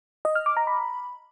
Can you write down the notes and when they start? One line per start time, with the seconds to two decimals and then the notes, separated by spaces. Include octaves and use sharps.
0.25 D#5
0.35 F6
0.46 D6
0.57 A#5
0.67 B5